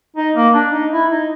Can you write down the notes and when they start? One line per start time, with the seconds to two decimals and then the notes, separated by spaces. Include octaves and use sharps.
0.16 D#4
0.36 A#3
0.54 D4
0.73 D#4
0.92 E4
1.11 D#4